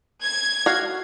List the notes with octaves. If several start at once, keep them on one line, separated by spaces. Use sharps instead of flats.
G#6
F#4 F5